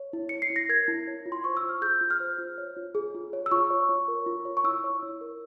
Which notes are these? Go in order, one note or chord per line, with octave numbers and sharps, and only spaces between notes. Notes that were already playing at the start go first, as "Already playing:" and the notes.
Already playing: C#5
E4
C#5 C#7
C7
E4
A#6
A#4 G#6
E4
C#5
F4
C6
C5 C#6
E6
F4
F6
G#4 G6
F4
F6
C5
F4
C#5
F4
G#4
F4
C#5
E6
F4 C#6
C#5
F4
A#4
F4
C#5
C#6
E4 E6
C#5
E4
A#4